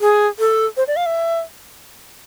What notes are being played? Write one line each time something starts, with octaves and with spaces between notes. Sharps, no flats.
G#4
A4
C5
D5
F5
E5